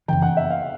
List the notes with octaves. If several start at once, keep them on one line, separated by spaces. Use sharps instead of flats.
F#2 C#3 E3 G5
F#5
E5
F5